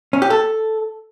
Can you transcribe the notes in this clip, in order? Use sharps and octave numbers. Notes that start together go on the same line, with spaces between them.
C#4
G4
A4